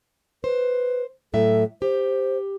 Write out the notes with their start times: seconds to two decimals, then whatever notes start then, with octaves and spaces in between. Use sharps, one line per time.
0.44 B4 C5
1.34 A2 F#3 A4 E5
1.82 G4 C5